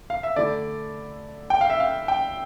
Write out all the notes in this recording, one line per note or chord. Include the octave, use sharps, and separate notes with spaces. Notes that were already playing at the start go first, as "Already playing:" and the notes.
F5
E5
D3 A3 E4 D5
G5
F5
E5
F5
G5